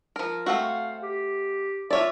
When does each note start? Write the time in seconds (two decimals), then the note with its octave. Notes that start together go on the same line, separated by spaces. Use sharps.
0.16 F3 A#4
0.46 A3 C4 F#4 F5
1.03 G4
1.91 F4 C#5 D5 E5